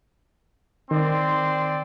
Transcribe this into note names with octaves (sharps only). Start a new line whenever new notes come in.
D#3 C4 D5 C6